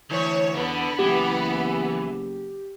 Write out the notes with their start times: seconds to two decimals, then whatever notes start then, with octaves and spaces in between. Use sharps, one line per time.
0.10 D2 E3 C#5
0.55 E2 D3 B3
0.99 F#1 E3 G4